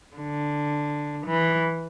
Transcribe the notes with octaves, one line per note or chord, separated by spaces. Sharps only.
D3
E3